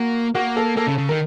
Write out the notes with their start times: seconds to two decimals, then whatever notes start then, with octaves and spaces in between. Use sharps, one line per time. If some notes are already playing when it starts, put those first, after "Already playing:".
Already playing: A#3 F#4
0.35 A#3 F#4
0.57 A4
0.77 A#3 A4
0.87 C#3
0.98 C#3
1.09 D#3 A#4